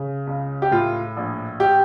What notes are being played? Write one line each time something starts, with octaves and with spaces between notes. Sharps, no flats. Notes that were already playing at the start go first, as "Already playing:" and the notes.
Already playing: C#3
C#2
G4
A2 F4
A#1
G4